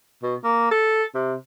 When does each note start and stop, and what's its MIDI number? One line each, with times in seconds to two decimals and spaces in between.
0.23 0.36 47
0.44 0.68 58
0.71 1.03 69
1.15 1.35 48